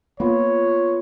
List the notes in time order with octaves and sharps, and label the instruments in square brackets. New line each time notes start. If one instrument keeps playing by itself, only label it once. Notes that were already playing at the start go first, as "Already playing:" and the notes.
[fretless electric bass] A#3 [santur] B3 F4 [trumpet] C#5